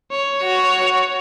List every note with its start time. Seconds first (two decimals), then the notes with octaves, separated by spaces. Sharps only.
0.11 C#5
0.42 F#4